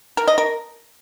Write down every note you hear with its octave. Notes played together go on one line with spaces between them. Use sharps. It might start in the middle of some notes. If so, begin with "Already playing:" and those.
A#4
D#5
A#4